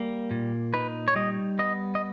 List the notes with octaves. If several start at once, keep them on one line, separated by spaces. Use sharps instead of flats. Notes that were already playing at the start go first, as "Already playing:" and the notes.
Already playing: G3 A#3
A#2
D#4 B4
C#5
G3 D#5
B3 D#5
D#5